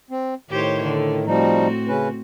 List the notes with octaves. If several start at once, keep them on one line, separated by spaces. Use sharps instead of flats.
C4
A2 D#3 G4 C5 C#5
D3
A2 F3 G3 C4 D#4 F#4
C#3 C#4 B4